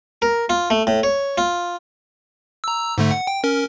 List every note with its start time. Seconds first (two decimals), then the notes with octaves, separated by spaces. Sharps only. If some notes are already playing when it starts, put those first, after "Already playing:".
0.22 A#4
0.49 F4
0.70 A3
0.87 A2
1.03 C#5
1.38 F4
2.64 A#5 E6
2.98 G#2 D3 A3
3.11 F#5
3.27 G5
3.44 C#4 A#4